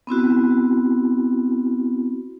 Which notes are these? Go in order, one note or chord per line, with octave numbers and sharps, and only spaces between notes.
B3 C4 E4 F#4